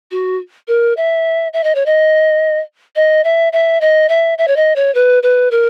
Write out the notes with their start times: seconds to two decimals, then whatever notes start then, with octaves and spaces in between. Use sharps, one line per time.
0.11 F#4
0.68 A#4
0.97 E5
1.53 E5
1.64 D#5
1.75 C#5
1.86 D#5
2.96 D#5
3.24 E5
3.53 E5
3.81 D#5
4.09 E5
4.38 E5
4.48 C#5
4.56 D#5
4.76 C#5
4.95 B4
5.23 B4
5.51 A#4